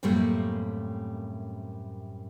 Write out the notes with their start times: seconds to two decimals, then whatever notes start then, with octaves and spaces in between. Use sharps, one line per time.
0.03 F#2 A2 C3 G3 A3 A#3